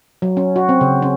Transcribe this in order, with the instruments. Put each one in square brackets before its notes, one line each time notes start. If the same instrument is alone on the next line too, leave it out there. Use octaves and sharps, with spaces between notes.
[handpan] F#3
C#4
F#4
C4
C#3
C#4